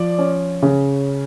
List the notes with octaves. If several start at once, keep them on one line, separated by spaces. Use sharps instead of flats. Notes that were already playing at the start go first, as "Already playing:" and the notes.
Already playing: F3 D5
C#4
C#3